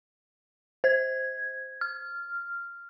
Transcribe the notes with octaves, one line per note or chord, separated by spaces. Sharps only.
C5 G#6
F6